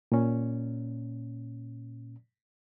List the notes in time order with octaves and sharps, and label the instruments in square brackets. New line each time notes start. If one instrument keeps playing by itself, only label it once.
[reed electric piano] A#2 C#4